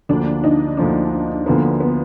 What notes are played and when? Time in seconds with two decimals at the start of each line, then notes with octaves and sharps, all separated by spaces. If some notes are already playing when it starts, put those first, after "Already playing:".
0.09 D2 D3 F3 A#3 D4
0.44 D#4
0.77 D2 D3 F3 A#3 D4
1.46 D2 D3 F3 A#3 B3
1.80 B3